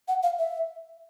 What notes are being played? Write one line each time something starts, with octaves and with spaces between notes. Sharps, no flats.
F#5
F5
E5